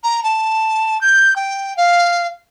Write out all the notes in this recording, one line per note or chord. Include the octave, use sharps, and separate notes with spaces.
A#5
A5
G6
G5
F5